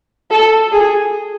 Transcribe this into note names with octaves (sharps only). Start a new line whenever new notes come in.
A4
G#4